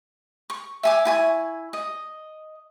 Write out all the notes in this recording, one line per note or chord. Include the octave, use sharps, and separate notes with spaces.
C#6
E5 G#5 D6
E4 G#5 C#6
D#5